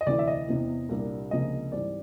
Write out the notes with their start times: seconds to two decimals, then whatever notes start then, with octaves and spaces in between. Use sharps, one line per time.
0.01 D#5
0.06 D2 C3 E3 D5
0.19 E5
0.27 D#5
0.48 E2 C3 E3
0.89 C2 A#2 G3 A#3 D4
1.31 C#2 C3 F3 A#3 D4 D#5
1.72 G#2 E3 G3 C4 D5